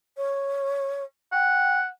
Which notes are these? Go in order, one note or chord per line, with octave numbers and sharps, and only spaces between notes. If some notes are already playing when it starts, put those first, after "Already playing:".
C#5
F#5 G5